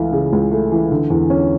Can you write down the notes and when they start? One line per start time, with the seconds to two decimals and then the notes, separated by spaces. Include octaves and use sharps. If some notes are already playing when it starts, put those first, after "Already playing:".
Already playing: C#2 E3 A3
0.13 C#3
0.33 C#2
0.51 A3
0.72 E3
0.91 D3
1.10 E2
1.30 C#4